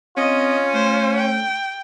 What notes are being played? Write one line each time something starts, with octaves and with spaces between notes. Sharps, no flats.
C4 C#4 F4 D#5
A3 C5
G5